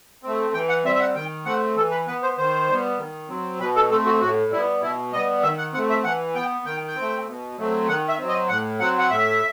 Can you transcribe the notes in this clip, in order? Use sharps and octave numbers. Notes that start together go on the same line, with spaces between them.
A3 C4
E3 G5
F#5
G3 C4 E5
E5
F#5
D#3 G5
A3 C4 F#5
E3 A4
B4
B3 B4
C5
D#3 C5
G3 B3
D#3
F#3 C4
B2 B4
A4
A3 C4 A4
F#4
A2 F#4
G3 B3 E4
B2 E4
G3 B3 D#5
D#3 E5
F#5
A3 C4 F#5
E5
E3 F#5
B3 G5
D#3 G5
G5
C4
A3
B2
F#3 A3 C4
D#3 F#5
E5
F#3 C4
D#5
A2 F#5
F#3 C4 F#5
F#5
A2 E5